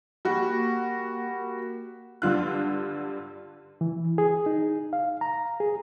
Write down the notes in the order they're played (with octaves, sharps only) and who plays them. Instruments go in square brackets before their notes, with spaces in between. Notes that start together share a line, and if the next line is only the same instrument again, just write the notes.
[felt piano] G3 F#4 [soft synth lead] A#3
[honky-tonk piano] G2 D3 F4 F#6
[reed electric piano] E3
G#4
D#4
F5
A#5
G#4